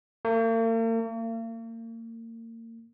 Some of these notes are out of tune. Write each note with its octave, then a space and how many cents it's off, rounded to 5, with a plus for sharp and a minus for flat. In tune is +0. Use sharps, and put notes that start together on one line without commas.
A#3 -45
A#3 -35